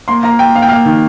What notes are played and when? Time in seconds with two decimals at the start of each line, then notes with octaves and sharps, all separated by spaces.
0.08 A#3 C6
0.23 A#3 A#5
0.39 A#3 G5
0.55 A#3 F5
0.62 G5
0.69 A#3 F5
0.85 D#3